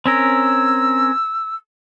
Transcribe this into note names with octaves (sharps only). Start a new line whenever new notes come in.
C4 C#4 A#4 E6